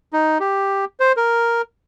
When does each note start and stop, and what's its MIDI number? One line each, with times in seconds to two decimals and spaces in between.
0.13 0.38 63
0.40 0.85 67
1.00 1.12 72
1.17 1.62 70